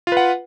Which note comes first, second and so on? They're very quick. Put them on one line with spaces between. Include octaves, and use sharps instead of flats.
F4 B4 F#5